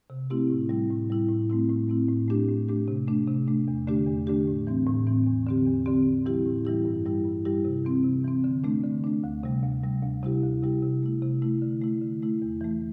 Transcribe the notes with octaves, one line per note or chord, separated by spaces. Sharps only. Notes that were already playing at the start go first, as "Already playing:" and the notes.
C3
A3 C4 E4 G4
A2
G3 E4
A2
G3 E4
A2
A3 C4 E4
A2
A3 C4 E4
A2
A3 D4 G4
A2
A3 D4 G4
C3
A3 D4
C3
A3 D4
E2
D3 A3 D4 G4
E2
D3 A3 D4 G4
A2
E3 C4
A2
E3 C4
E2
D3 C4 G4
E2
D3 C4 G4
A2
E3 G3 E4 G4
A2
E3 G3 E4 G4
G2
G3 E4 G4
G2
G3 E4 G4
C3
E3 C4
C3
E3 C4
D3
A3 D4
D3
A3 D4
D2
C3 G3
D2
C3 G3
D2
C3 G3 E4 G4
D2
C3 G3 E4 G4
C3
A3 E4
C3
A3 E4
D3
A3 E4
D3
A3 E4
E2
E3 A3